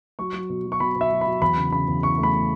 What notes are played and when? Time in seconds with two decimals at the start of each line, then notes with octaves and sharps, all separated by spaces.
0.19 F#3 C#6
0.34 F#3
0.50 B2
0.65 F#3
0.72 C#6
0.80 B2 B5
0.96 B2
1.01 E5
1.12 F#3
1.21 B5
1.26 F#3
1.41 E2 B5
1.57 C#3
1.72 C#3 B5
1.88 E2
2.03 E2 C#6
2.18 A3
2.23 B5
2.34 A3